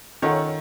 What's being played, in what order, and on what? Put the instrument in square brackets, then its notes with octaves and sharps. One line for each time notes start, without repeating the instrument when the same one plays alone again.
[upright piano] D#3 [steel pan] C#4 F4 A4 C#5 F#5